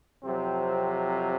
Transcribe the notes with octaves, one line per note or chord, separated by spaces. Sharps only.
F2 C3 F#3 C4